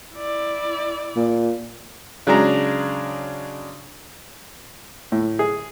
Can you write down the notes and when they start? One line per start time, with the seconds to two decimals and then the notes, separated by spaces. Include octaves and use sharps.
0.15 E4 D5
1.16 A#2
2.27 C#3 F#3 G#3 D4 A#5
5.12 A2
5.39 G#4